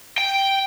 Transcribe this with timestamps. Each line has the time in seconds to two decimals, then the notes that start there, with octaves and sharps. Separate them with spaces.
0.18 G5